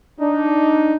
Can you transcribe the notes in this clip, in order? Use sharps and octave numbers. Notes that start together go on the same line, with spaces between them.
D4 D#4